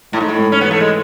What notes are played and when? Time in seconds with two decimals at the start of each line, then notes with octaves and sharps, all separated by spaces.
0.12 A2 A3
0.21 G#2
0.29 A2
0.38 G#2
0.52 C#4
0.61 E3 B3
0.71 A3
0.80 G#3